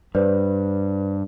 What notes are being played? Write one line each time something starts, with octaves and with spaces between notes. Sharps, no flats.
G2 B4 C5 D5